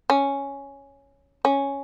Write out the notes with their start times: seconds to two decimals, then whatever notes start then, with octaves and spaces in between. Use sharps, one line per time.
0.10 C#4
1.45 C#4